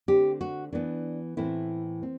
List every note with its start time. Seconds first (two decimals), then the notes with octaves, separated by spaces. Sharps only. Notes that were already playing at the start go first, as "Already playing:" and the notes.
0.08 D3 A3 C4 G4
0.41 F#4
0.73 E3 B3 D4
1.37 A2 E3 A3 C4 E4
2.03 C4